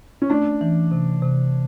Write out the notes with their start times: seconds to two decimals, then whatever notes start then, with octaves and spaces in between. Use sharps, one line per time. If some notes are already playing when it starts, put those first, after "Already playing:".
0.22 C#4
0.30 A3 D4
0.61 E3
0.91 C3
1.22 C3